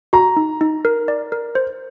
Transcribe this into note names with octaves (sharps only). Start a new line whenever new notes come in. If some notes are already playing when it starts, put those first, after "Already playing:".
F#4 A#5
D#4
D#4
A#4
D5
A#4
C5